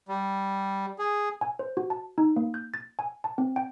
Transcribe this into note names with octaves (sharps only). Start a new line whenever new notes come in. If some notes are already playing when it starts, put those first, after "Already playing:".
G3
G#4
G#5
C5
F#4
A5
D#4
A#3
G6
A6
G#5
A5
C4
G5